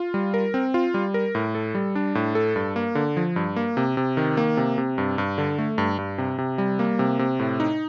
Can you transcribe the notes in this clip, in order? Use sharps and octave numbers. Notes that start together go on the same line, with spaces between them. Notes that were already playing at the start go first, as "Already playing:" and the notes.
Already playing: F4
G3
A#4
C4
F4
G3
A#4
A2
A4
G3
D4
A2
A4
G2
A#3
D3
F3
G2
A#3
C3
C3
D#3
A#3
C3
C3
G2
G2
D3
A3
G2
G2
C3
C3
G3
A#3
C3
C3
A2
D#4